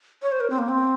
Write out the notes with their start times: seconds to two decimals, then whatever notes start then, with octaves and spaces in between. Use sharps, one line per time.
0.22 C#5
0.32 C5
0.40 A#4
0.50 C4
0.59 A#3
0.68 C4